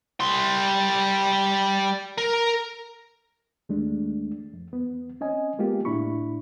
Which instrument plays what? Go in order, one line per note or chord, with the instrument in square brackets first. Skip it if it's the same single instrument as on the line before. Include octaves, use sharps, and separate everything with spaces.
[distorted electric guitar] G3 C6
A#4
[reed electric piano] D#2 G#3 A3 D4
F2
E2 B3
C4 C#4 D#5 G#5
G#3 A#3 B3 F4 G4
A2 D4 E4 B5 C#6